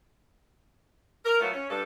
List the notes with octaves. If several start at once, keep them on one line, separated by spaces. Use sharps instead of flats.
A#4
F#3 A3 B3 F4 F#4
C#4
G2 A4